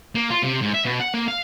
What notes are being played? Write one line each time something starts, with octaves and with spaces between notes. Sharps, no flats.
A#3
F4
C3
G#2
E5
B2
F#5
A#3
F5